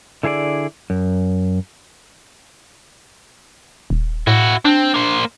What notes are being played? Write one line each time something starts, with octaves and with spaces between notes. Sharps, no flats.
D3 E4 G#4 C#5 D5
F#2
D#1
A2 E4 F#4
C4 D4
A#3 C5